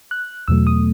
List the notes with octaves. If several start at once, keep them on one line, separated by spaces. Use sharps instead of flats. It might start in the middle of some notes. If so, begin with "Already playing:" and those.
F#6
E2 B2 F#3 A3 E6
D#6